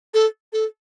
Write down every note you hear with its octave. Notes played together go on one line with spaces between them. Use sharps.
A4
A4